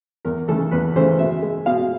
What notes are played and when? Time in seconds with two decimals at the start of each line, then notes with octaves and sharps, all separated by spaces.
0.25 E2 A#4
0.48 C#3 E3 A3 A4
0.71 E2 B4
0.96 C#3 E3 A3 C5
1.19 B2 E5
1.42 G#3
1.66 B2 F5